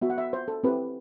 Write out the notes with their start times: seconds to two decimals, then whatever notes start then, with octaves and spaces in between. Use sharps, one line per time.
0.02 B3 F#4 E5
0.10 F#5
0.18 E5
0.33 C5
0.48 A4
0.64 C4 E4 G4 B4